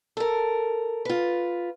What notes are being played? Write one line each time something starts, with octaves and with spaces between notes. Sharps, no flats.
A4 A#4
F4 B4